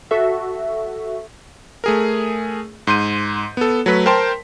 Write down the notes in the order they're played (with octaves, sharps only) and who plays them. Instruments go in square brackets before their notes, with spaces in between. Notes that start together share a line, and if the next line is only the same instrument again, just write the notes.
[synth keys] F#4 A4 E5
[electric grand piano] A3 G#4 A#4
G#2 C6 G6 D#7
B3 A4
F#3 A3 B4 B6
A#4 C5 G5 A5 C6